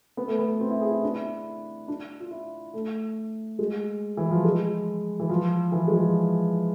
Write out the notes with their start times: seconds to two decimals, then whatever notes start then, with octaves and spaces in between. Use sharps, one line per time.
0.17 B3
0.28 A3
0.39 B3
0.60 C4
0.70 E4
0.81 G#4
0.92 E4
1.03 D4
1.13 E4
1.88 D4
2.20 F4
2.31 E4
2.74 A3
3.59 G#3
4.17 E3
4.31 F3
4.44 G#3
5.20 E3
5.29 F3
5.72 E3
5.88 G#3
5.94 F3